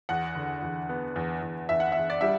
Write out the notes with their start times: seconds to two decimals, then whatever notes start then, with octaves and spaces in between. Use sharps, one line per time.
0.09 E2 F#5
0.35 D3
0.62 E2
0.89 B3
1.16 E2
1.42 E2
1.69 E2 E5
1.80 F#5
1.92 E2 E5
2.10 D5
2.21 G3 E5